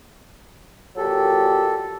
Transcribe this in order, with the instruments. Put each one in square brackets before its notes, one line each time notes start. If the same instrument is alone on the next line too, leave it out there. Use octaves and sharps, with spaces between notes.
[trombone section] A#2 F#3 G4 [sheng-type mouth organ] A4